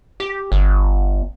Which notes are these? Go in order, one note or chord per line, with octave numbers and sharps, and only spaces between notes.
G4
G1